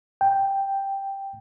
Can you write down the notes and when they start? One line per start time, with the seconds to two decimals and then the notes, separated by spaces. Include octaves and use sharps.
0.21 G5